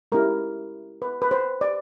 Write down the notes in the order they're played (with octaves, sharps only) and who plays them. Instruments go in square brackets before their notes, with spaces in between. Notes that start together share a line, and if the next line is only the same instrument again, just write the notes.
[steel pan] G#3 C#4 E4 G4 A#4
B4
B4
C5
D5